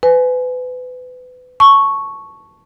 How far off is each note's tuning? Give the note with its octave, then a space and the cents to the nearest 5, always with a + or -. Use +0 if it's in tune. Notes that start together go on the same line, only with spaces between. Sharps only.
B4 +30 G#5 +15
A5 +0 C#6 +0